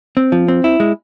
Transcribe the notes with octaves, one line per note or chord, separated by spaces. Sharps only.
C4
F3
C4
E4
G#3